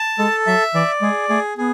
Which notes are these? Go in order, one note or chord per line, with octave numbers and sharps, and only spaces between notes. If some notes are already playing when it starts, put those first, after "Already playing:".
Already playing: A5
G#3 A4
F#3 E5
E3 D5
G#3 G#4
A3 G#4
B3 G#4